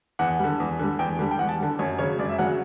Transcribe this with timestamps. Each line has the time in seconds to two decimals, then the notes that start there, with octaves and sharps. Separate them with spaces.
0.19 E2 F#5
0.39 D3 G3
0.60 E2
0.79 D3 G3
0.99 E2 G5
1.19 D3 G3
1.31 G5
1.39 E2 F#5
1.49 A5
1.59 D3 G3
1.79 F#2 C#5
1.98 C#3 F#3 C#5
2.19 F#2 D5
2.29 E5
2.38 C#3 F#3 F#5